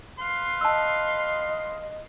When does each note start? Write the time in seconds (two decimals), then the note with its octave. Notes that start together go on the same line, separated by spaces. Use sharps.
0.19 B4 F5 C6
0.61 D#5 A5 E6